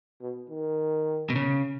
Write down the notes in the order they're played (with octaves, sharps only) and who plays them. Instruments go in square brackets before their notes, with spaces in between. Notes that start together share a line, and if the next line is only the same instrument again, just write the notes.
[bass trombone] B2
D#3
[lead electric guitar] B2
C#3